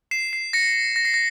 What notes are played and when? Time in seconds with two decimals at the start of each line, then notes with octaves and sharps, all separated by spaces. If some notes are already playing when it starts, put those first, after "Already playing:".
0.11 C7 E7
0.33 C7
0.53 A#6 C#7
0.96 A#6
1.05 C7
1.14 A#6